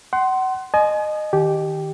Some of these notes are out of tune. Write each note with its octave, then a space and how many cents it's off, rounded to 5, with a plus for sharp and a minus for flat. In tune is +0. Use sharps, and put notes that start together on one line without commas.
F#5 +30 C6 +0
D#5 -20 G#5 +35
D#3 +0 G4 -5